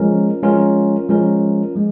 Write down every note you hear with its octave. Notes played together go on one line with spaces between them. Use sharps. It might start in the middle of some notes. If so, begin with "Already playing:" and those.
Already playing: F3 G#3 C#4 F4 A#4
F3 G#3 C#4 F4 A#4
F3 G#3 C#4 F4 A#4
F3 G#3